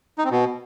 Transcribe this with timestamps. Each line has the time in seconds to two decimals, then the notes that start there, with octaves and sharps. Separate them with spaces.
0.18 D#4
0.25 C4
0.31 B2